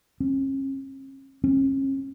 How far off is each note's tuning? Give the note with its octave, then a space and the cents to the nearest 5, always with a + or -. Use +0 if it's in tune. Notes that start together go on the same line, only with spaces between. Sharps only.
C#4 -40
C#4 -35